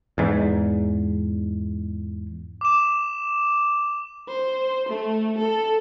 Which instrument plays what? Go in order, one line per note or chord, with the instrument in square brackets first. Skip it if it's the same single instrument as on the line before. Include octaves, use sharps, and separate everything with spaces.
[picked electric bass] E2 G#2
[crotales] D6 E7
[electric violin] C5
A3
A4